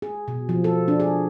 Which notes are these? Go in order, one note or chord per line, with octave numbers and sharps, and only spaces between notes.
G#4
B2
F3
A4
D4
G#4